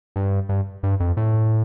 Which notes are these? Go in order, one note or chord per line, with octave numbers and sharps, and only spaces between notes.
G2
G2
G2
F2
A2